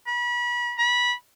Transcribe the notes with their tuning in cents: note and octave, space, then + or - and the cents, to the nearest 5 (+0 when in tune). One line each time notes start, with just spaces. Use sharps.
B5 -35
B5 -25